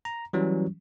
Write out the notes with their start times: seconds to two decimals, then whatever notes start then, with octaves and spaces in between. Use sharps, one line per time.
0.05 A#5
0.33 E3 F#3 G3 C#4